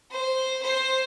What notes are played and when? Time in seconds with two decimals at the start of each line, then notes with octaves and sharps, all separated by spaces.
0.11 C5
0.63 C5